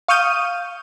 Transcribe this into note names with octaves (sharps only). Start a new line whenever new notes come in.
F5 C#6 D#6 F6 G6 D#7